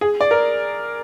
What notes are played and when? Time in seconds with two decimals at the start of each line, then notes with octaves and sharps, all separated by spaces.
0.01 G#4
0.21 D5
0.31 A#4